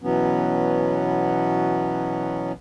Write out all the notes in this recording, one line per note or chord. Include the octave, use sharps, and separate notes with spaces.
B2 E3 F#3 B3 C#4